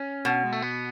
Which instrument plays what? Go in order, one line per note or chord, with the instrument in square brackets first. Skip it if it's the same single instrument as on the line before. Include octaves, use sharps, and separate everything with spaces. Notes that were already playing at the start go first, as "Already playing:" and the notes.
Already playing: [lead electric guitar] C#4
[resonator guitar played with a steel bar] B2
[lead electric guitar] G#3
A3
B3